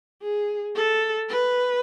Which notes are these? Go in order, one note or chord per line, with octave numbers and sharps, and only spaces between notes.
G#4
A4
B4